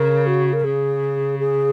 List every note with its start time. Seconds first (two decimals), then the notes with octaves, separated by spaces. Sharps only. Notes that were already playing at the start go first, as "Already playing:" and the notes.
Already playing: C#3 A#4
0.27 F#4
0.53 A#4
0.64 C#3 G#4
1.39 G#4